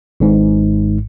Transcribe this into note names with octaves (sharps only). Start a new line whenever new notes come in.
G#1 G#2